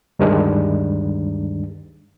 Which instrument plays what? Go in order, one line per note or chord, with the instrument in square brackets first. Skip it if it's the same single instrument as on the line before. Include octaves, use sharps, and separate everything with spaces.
[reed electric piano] D2 G2 D#3 G3 G#3 D4